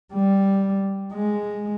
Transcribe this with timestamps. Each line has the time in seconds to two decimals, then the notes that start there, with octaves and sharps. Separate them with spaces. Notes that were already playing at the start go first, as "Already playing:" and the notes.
0.14 G3
1.13 G#3